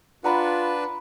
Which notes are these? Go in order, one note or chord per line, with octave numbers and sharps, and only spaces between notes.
D4 F4 B4 F#5 A#5 B5